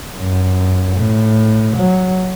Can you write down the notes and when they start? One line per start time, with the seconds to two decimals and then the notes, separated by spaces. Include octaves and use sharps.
0.15 F#2
0.96 A2
1.76 F#3